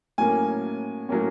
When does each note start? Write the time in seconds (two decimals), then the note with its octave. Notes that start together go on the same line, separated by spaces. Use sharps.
0.18 A2 F#3 A#3 C#4 G#5
1.09 A2 F#3 A#3 C#4